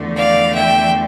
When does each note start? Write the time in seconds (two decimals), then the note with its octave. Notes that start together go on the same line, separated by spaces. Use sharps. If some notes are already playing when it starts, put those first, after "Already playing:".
Already playing: E2 D3 F3 A3
0.15 D5 F5
0.54 E5 G5